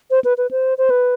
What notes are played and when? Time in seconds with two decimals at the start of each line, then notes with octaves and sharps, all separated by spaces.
0.11 C5
0.24 B4
0.38 B4
0.51 C5
0.78 C5
0.90 B4